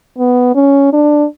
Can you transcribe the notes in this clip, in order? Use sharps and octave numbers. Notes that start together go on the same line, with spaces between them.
B3
C#4
D4